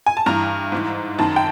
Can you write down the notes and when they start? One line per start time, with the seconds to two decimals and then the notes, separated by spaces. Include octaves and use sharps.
0.06 G#5
0.17 A5
0.26 G2 E3 A#5
0.72 G#2 E3
1.18 F#2 D#3 A5
1.36 G5